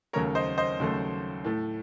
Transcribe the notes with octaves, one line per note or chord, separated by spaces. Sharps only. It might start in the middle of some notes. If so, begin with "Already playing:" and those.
D#2 C#3 F#3 A3 A#4 C#5
C5 D#5
C5 D#5
D#2 C#3 F#3 A3
A2 A3